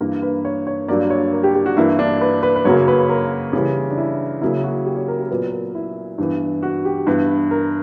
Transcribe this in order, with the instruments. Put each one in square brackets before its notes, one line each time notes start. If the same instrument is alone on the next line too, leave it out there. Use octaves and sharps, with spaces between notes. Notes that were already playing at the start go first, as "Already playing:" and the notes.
[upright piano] G2 E3 A#3 A#4
B4
C#5
C#5
G2 F#3 A#3 D5
C#5
A#4
G4
G4
F#4
G2 E3 A#3 E4
D4
B4
B4
B4
F#2 C#3 F#3 A#3 C#5
B4
A#4
C#3 E3 G3
D4
E4
C#3 F#3 A#3 E4
F#4
G4
C#5
A#4
G4
A#2 F#3 B3 A#4
A#4
E4
G2 E3 B3
F#4
G4
G2 E3 B3 B4
A#4